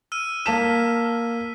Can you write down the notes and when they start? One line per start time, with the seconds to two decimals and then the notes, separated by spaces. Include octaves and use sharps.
0.12 E6 F6 D#7
0.46 A#3 A5 B6 E7